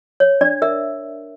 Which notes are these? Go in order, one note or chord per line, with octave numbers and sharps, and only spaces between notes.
C#5
D4 D5
A#4 E5